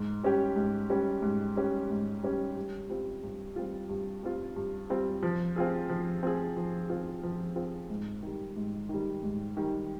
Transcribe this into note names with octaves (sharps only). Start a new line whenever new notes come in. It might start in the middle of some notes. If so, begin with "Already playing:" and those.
Already playing: G#2
G3 C#4 G4
G#2
G3 C#4 G4
G#2
G3 C#4 G4
G#2
G3 C#4 G4
G2
G3 C4 F4
G2
G3 C4 F4
G2
G3 C4 F4
G2
G3 C4 F4
F3
C4 F4 G#4
F3
C4 F4 G#4
F3
C4 F4 G#4
F3
C4 F4 G#4
G#2
D#3 G3
G#2
D#3 G3
G#2
D#3 G3